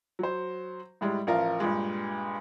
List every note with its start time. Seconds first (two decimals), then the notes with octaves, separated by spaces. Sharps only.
0.19 F#3 C5
1.01 A2 G3 G#3
1.27 A1 F3 F4 A#4
1.60 G2 A#2 G#3